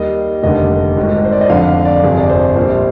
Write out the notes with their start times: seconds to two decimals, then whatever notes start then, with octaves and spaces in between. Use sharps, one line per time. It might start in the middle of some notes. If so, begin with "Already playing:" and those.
Already playing: D#2 D#3 G3 D#5
0.43 F1 D#2 D3 G3 D#5
0.97 G#1 G#2 D#3
1.25 C5
1.32 D5
1.41 D#5
1.49 F2 D3 F3 F5
1.68 F5
1.85 D5
2.03 G1 F2 C3 G#4
2.20 D5
2.29 C5
2.56 A#1 A#2 G3 C5